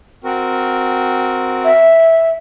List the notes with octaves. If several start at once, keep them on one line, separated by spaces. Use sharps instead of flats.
C4 F#4 A#4
E5